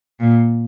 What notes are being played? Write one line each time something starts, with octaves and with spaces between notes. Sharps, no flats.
A#2